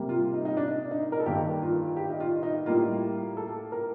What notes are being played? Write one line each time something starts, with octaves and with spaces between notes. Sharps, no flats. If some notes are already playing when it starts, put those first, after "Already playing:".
Already playing: C3 G3 A#3
F4
D#4
D#4
D4
D#4
A#4
A4
G2 D#3 G3 A#3 G4
F4
G4
D#4
F4
D#4
A2 G3 A#3 F4
A4
A#4